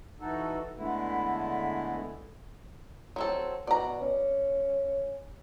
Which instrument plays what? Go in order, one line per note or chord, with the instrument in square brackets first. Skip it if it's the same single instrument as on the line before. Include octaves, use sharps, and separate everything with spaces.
[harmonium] E3 D#4 F#4 A4
D3 G#3 A3 B3 E4
[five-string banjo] F#3 C4 A4
[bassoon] B2 [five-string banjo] D5 A#5
[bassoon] C#4